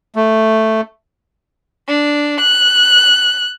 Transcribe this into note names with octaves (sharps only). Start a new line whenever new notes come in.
A3
D4
F#6